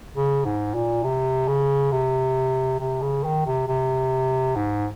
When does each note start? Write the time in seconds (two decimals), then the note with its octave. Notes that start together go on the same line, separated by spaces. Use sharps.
0.16 C#3
0.45 G#2
0.75 A#2
1.04 C3
1.48 C#3
1.92 C3
2.80 C3
3.02 C#3
3.24 D#3
3.46 C3
3.68 C3
4.56 G#2